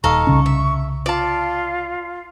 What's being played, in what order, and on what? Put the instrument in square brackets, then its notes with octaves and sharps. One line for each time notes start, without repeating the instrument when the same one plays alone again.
[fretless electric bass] D#1 [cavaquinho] D#4 A4 F5 [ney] C#6
[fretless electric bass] C2 C#3 C#4
[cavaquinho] E5
[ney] F4 [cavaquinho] D5 A5